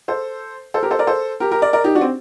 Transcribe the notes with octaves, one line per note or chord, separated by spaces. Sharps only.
A4 C5
A4 C5
G4 A#4
A4 C5
A#4 D5
A4 C5
G4 A#4
G4 A#4
A#4 D5
A#4 D5
D#4 G4
D4 F#4
C4